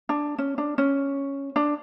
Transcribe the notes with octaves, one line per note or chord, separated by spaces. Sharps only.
D4
C#4
D4
C#4
D4